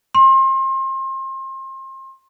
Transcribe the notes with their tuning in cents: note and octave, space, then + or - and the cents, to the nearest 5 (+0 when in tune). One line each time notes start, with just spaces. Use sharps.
C6 +35